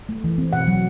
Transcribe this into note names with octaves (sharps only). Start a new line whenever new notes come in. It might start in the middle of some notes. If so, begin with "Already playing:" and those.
A3
E3
C4
B2 F#5
F#3